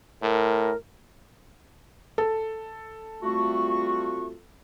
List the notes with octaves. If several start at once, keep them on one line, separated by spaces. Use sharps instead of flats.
A2 A#4
A4
G3 A3 C4 F4 F#4 C#6